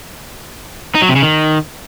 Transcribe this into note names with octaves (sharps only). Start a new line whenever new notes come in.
D#4
F#3
C3
C#3
D#3